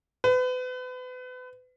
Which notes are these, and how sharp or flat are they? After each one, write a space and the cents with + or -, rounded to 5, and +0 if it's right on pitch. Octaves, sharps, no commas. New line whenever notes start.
B4 +35